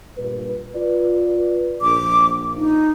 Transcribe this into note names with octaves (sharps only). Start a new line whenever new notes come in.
G2 A#2 B4
F4 B4 D5
A#1 D6
D#4